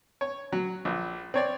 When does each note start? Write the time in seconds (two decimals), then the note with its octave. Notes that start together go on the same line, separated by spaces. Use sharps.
0.21 C#5
0.52 F#3
0.85 A#1
1.34 C4 C#5 D5